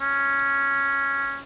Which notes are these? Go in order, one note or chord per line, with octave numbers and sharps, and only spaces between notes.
C#4